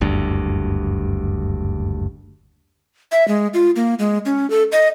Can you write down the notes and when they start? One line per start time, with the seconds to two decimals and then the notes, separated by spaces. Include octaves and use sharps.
0.01 F#1 D2 G2
3.12 E5
3.28 G#3
3.54 F4
3.76 A#3
3.99 G#3
4.26 C#4
4.50 A4
4.72 D#5